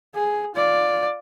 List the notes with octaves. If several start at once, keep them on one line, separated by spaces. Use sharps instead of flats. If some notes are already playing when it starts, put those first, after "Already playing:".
G#4
F4 D5